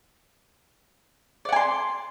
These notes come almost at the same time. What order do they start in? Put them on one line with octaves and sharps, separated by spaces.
D5 F#5 G#5 C6